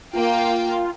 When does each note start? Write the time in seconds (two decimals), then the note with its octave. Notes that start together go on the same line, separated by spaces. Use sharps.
0.13 A#3 F4 F5 G5